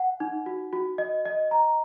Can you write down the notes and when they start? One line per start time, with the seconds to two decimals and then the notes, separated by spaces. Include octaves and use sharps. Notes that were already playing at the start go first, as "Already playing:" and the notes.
Already playing: F#5
0.20 D#4
0.46 F#4
0.73 F#4
0.98 D#5
1.25 D#5
1.51 A#5